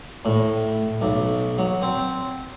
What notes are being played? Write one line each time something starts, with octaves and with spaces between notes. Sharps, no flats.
A2
B1
F#3
C4